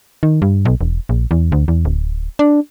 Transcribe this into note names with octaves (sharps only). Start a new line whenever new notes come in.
D#3
G2
B1
E1
A#1
E2
D2
E2
D1
D4